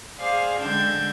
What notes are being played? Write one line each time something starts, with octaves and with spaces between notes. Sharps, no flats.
G#4 C5 D5 F5 G#5
D3 G#3 G5 A5 G6 G#6